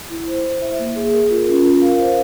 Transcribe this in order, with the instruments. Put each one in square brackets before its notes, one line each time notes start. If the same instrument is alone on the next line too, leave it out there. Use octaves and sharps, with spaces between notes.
[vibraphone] E4
C5
E4
E5
A#3
G#4
A#4
F4
C#4
A#4
F5
C5